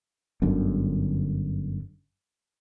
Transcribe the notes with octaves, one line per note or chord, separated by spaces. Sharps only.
G1 F#2 D3